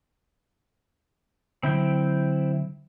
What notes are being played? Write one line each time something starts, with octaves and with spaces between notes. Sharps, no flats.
D3 F#3 C4 E4 G5